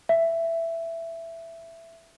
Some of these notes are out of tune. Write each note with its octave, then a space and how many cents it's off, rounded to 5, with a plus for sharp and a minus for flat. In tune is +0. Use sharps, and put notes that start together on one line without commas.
E5 +10